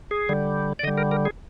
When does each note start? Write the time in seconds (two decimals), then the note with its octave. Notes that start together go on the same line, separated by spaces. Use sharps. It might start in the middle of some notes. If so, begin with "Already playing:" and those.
0.11 G#4
0.29 D3 G3
0.79 D5
0.83 D3 D#5
0.88 G3
0.97 A#4
1.11 A#4
1.25 G#4